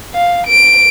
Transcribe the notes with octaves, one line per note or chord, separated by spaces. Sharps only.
F5
D7